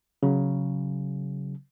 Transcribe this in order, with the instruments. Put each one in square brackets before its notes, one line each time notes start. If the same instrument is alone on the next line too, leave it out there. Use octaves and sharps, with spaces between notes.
[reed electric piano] C#3 F#3